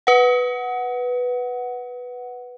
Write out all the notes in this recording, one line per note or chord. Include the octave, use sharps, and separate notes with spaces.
B4 F#5